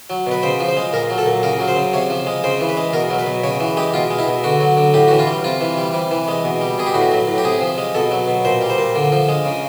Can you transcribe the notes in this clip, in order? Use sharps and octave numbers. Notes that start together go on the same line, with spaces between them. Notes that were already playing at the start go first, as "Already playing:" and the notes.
F#3
B2 B4
C#3 C5
F3
C5
G#3
A#2 A#4
F#3
A4
A#2
C#3 A#4
F#3
C5
C#3
C3 C#5
F3
G#3
C#3 C5
E3
B4
G#3
B2 A#4
F#3
B4
B2
C#3 C#5
E3
G#3 G4
B2 F4
G#3
E4
B2
D3 F#4
F#3
D3
A2 G4
E3 F#4
F4
G3
C3 F4
E3
G3
C3
E3
G#3
B2
G3
B2 G#4
G4
A2 F#4
F#3
A2
G4
C3 G#4
F3
G#3
B2 A4
F#3
B2
A#2 C5
G3
C5
A#2
D3
F3
G#3
C#3